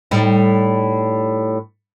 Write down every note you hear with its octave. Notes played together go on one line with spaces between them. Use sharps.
A2 G3 D#4